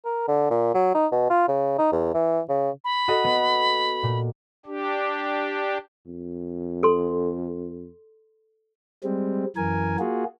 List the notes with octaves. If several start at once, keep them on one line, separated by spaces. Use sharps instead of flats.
A#4
D3
A#2
F#3
D#4
B2
F4
C#3
D#4
E2
E3
C#3
B5
F#4 A4 D#5
B3
A#2
D4 G4
F2
A4 C6
G3 G#3 C4
F#2 E3 A#4 G#5
A#3 F4 F#4 G#4